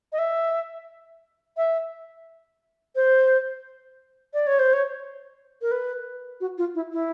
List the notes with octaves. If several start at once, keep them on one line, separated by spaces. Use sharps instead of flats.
D#5
E5
E5
C5
D5
C#5
C5
C#5
A#4
B4
F#4
F4
E4
E4